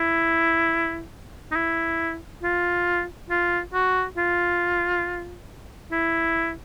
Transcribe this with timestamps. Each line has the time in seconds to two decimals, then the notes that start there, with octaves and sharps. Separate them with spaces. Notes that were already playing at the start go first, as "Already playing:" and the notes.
Already playing: E4
1.52 D#4
1.56 E4
2.43 F4
3.30 F4
3.74 F#4
4.17 F4
5.92 E4